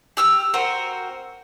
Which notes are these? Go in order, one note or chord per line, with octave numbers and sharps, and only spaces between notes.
G4 E6 F6
C4 F#4 A#4 C5